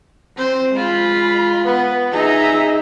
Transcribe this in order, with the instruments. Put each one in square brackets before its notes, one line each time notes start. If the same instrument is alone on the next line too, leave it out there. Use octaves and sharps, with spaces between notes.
[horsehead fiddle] C4 [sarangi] C5
[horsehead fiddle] G#3 B5 [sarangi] F4
[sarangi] B3 [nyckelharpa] B4
[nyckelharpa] D#4 [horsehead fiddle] G#4 E5 [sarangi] A#5